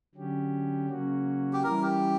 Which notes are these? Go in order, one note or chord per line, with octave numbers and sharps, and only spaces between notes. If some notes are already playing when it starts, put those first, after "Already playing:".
D3 F#3 C#4 G4
C#3 F#3 A#3 C#4 F#4
G4
E3 G3 C#4 E4 A#4
G4